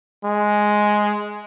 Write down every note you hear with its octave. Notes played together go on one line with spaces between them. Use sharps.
G#3